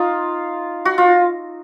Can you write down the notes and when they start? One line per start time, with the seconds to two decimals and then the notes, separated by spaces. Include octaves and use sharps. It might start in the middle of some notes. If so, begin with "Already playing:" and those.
Already playing: D#4 F4
0.85 F#4
0.98 F4